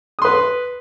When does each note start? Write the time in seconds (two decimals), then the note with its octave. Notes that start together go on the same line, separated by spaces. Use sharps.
0.19 D#6
0.22 C6
0.25 B4